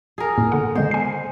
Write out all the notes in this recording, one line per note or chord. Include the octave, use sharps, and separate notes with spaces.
G#4 A#4
A2 A#3
D3 F#5
D3 G#3 B3 C5
G#5 C7